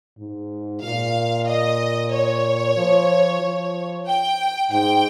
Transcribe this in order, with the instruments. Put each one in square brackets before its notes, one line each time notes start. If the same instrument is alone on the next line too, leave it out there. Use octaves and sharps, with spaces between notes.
[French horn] G#2
[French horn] A#2 [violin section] F5
[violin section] D#5
C#5
[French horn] F3
F3
[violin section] G5
[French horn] G#2 [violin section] G5